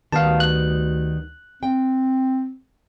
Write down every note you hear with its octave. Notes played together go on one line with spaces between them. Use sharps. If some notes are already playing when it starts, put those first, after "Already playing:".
D2 D#3 G3 B3 F5 A5
F#6
C4 G5